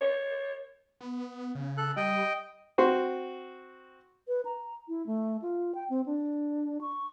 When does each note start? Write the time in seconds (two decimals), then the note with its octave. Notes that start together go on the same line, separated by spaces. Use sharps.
0.01 C#5
1.01 B3
1.55 C#3
1.78 A4 F#6
1.97 G3 D#5 G5
2.78 C4 F#4 C5 C6
4.27 B4
4.45 A#5
4.88 E4
5.07 A3
5.42 F4
5.75 G5
5.90 C4
6.06 D4
6.81 C#6